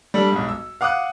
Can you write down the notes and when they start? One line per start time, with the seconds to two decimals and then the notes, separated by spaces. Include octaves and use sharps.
0.14 G3 D4 A4
0.32 B1 G#2
0.49 E6
0.81 F5 F#5 D6 D#6 F#6